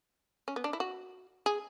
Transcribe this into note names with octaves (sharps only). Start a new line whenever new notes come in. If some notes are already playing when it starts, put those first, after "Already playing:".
C#4
B3
D4
E4
F#4
G#4